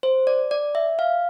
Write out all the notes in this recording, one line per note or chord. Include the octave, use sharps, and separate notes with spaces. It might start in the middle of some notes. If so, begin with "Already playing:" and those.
C5
D5
D5
E5
F5